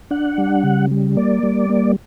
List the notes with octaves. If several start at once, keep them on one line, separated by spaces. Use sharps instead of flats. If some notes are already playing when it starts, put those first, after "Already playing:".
D4 F#5
G3
C#3
G3
A#3 D5
G3
A#3